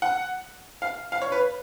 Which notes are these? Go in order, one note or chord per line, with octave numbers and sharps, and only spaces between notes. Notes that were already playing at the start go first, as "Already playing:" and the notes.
F#5
F5
F5
C#5
B4